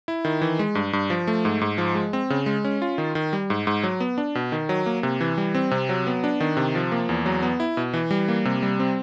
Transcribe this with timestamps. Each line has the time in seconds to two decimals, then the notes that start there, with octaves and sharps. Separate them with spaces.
0.08 E4
0.25 D#3
0.41 E3
0.59 G#3
0.75 G2
0.93 G2
1.10 F3
1.27 A3
1.45 G#2
1.61 G#2
1.78 F3
1.95 G#3
2.13 C4
2.30 C#3
2.46 G#3
2.65 C#4
2.82 F4
2.98 D#3
3.15 D#3
3.33 G3
3.50 G#2
3.67 G#2
3.83 F#3
4.00 B3
4.18 D4
4.35 B2
4.52 D#3
4.69 F#3
4.86 A#3
5.03 C3
5.20 E3
5.38 G3
5.54 C4
5.71 C3
5.89 F#3
6.07 B3
6.24 D4
6.40 D#3
6.57 C3
6.75 F3
6.92 A#3
7.09 E2
7.26 F#3
7.42 B3
7.60 E4
7.77 B2
7.93 E3
8.11 G3
8.28 A#3
8.45 C3
8.63 G3
8.80 C4